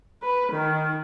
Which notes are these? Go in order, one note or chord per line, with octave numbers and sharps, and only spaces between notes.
B4
D#3